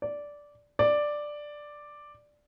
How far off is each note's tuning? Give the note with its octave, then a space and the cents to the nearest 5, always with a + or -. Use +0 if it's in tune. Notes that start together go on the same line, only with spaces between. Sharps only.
D5 -10
D5 +5